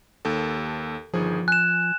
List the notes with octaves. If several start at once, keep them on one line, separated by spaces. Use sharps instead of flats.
D#2 A4
G1 D#3 F3 G#4
G#5 F#6 E7